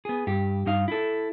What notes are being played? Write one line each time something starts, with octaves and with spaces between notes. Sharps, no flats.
B3 G#4
G2 G4
G2 D#4 F5
E4 A4